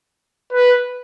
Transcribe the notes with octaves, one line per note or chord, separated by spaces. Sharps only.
B4